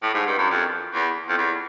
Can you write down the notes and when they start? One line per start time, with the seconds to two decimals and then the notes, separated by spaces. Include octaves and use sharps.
0.03 A2
0.14 G#2
0.26 G2
0.38 F#2
0.50 F2
0.94 E2
1.29 F2
1.38 E2